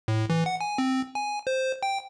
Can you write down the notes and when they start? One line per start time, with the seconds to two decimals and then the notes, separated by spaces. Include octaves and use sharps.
0.08 A2
0.30 E3
0.46 F#5
0.61 G#5
0.78 C4
1.15 G#5
1.47 C5
1.83 G5